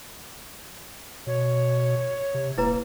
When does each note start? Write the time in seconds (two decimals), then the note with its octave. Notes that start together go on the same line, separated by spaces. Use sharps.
1.27 B2 C#5
2.34 C3
2.58 D#1 A#3 E4 B4 A#5